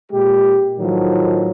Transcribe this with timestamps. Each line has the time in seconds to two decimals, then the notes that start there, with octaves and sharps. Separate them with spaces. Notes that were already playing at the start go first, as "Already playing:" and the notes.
0.11 A#2 G#3 G4
0.78 A2 D#3 F3 F#3